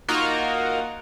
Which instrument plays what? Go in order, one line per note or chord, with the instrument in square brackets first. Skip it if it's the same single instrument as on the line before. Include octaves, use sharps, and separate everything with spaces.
[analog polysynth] A#3 D#4 F4 F#4 A#4